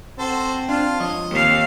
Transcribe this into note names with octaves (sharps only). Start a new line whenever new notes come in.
C4 F#4 A4 C5
D4 F4 A5
F3 C#5 D#5
D#2 C4 F5